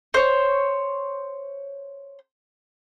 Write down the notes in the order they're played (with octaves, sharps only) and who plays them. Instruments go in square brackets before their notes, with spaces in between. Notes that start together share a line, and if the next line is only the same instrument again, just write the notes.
[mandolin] C5 C#5